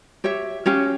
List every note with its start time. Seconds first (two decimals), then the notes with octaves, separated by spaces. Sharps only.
0.24 G4 C#5 E5
0.66 C#4 G4 C#5 F5